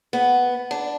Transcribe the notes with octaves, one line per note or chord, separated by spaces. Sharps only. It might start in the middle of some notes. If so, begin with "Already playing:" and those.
B3
D4